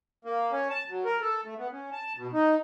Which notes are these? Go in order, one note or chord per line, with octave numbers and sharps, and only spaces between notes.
A#3
C#4
A5
F#3
A#4
A4
A3
B3
C#4
A5
B2
D#4